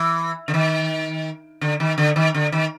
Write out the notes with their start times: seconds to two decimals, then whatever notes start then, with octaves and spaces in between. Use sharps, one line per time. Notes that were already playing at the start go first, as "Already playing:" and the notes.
Already playing: E3
0.48 D3
0.54 D#3
1.61 D3
1.80 D#3
1.98 D3
2.16 D#3
2.34 D3
2.52 D#3